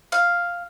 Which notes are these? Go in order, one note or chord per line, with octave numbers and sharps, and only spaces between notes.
F5